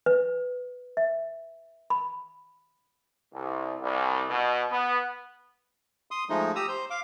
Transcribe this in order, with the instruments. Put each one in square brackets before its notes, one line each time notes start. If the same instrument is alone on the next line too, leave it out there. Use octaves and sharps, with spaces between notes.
[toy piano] B4
E5
B5
[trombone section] C2
C2
B2
B3
[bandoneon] C6 D#6
F3 G#3 A3 D#4
G4 A#5 D#6 E6
C5 G6
F5 D6